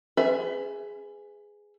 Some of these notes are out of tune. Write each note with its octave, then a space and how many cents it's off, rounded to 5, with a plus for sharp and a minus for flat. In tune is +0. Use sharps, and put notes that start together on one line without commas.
G#4 +0 B4 +35 E5 +5